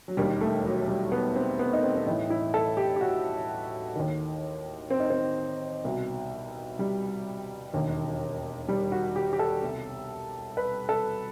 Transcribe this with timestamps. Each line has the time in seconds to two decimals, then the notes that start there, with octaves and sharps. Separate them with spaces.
0.08 F#3
0.17 E1 D#2 D#3 G3
0.41 A3
0.64 F#3
0.88 G3
1.12 B3
1.36 C4
1.59 B3
1.73 D#4
1.83 C4
1.96 C4
2.06 A1 A2 E3 D#4
2.30 E4
2.54 A4
2.77 G4
2.96 G4
3.01 F#4
3.96 D#2 D#3
4.90 C4
5.00 D#4
5.10 C4
5.84 C2 B2
6.79 G3
7.73 E1 D#2 D#3
8.68 G3
8.92 F#4
9.16 G4
9.33 G4
9.39 A4
9.63 C2 B2
10.57 B4
10.89 A4